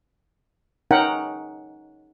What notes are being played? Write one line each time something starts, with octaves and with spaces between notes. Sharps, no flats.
C#4 D#4 A#4 F#5 G5